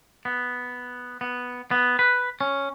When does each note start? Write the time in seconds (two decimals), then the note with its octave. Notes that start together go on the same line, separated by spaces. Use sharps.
0.25 B3
1.21 B3
1.71 B3
1.99 B4
2.41 C#4